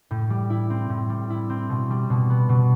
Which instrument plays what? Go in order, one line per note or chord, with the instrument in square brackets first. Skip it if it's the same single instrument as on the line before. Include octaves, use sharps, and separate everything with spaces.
[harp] A2
G3
E4
C4
A2
G3
E4
C4
B2
G3
B2
B3
B2